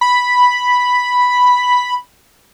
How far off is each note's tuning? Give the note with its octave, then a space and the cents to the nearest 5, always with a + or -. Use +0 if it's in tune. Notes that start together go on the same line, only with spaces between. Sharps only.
B5 +0